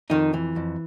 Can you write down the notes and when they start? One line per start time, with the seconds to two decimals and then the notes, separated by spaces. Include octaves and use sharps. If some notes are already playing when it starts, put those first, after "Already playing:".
0.10 F2 D#3 D#4
0.34 E3
0.56 F2